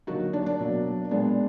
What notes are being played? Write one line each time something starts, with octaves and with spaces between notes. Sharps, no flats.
D3 F#3 A#3 D#4 F#4
D4
D4
B2 F#3 A#3
A#2 G#3 B3 D4